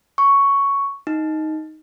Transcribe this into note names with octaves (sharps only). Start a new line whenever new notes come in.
C#6
D#4